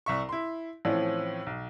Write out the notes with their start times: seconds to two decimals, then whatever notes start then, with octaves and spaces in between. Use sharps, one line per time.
0.06 C2 E5 C#6
0.29 E4 C6
0.85 A2 E3 F3 C4 C#4
1.47 B1